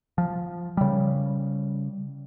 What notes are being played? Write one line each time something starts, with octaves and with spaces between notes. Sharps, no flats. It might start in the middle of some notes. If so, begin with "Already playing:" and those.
F3
C#3 G3